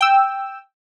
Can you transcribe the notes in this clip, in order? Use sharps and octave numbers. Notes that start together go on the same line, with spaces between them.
G5 E6